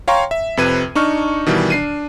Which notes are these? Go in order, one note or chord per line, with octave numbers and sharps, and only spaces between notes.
C#5 F5 G5 A#5 C6 C#6
E5
F2 C3 B4 G#6 D#7
D4 D#4 C#6 F6
B2 D#3 E3 G3
D4 C7 D#7